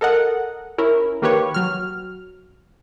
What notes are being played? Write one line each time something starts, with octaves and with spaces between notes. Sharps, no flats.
A4 A#4 D#5 F#5
C#4 E4 A#4
D#3 A#3 G4 B4 C#5
F#3 F6